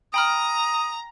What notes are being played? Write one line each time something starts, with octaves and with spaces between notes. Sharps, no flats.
G5 A#5 B5 D#6 F6